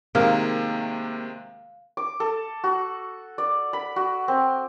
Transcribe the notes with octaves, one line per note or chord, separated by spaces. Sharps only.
C3 D#3 G#3 A#3
D6
A4
F#4
D5
B5
F#4
C4